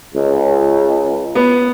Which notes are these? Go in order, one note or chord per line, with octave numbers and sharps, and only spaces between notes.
C#2
B3